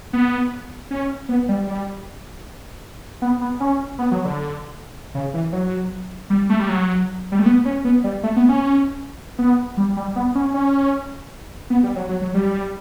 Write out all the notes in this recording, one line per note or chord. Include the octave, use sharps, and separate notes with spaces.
B3
C#4
B3
G3
G3
B3
B3
C#4
B3
F#3
D3
C#3
E3
F#3
G3
A3
G3
F#3
G3
A3
B3
C#4
B3
G3
A3
B3
C#4
B3
G3
G3
B3
C#4
C#4
B3
G3
F#3
F#3
F#3
G3